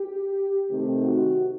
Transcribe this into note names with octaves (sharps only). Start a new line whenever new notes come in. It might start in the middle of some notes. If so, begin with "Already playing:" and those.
Already playing: G4
C3 D#3 A3 C4 D#4 G4
F#4